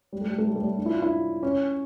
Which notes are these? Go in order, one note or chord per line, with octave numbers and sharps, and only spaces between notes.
G3
A3
G3
A3
G3
A3
G3
D4
E4
F4
E4
C#4